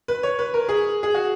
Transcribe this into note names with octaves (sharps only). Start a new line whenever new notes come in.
B4
C#5
B4
A#4
G#4
G#4
F#4